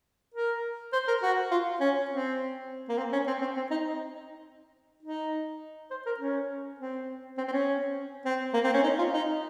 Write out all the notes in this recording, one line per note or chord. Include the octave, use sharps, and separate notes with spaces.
A#4
C5
A#4
F#4
F4
C#4
C4
A#3
C4
C#4
C4
C4
C4
D#4
D#4
C5
A#4
C#4
C4
C4
C4
C#4
C4
A#3
C4
C#4
D#4
F4
D#4